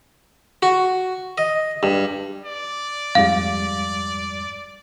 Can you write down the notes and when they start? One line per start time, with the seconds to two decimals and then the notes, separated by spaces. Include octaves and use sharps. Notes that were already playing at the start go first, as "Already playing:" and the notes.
0.63 F#4
1.38 D#5
1.83 G2
2.45 D5
3.15 F2 G#2 G3 F5